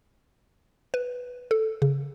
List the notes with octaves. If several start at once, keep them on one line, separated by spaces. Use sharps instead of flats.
B4
A4
C#3